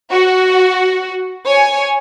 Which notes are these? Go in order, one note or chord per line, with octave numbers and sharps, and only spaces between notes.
F#4
C#5 G#5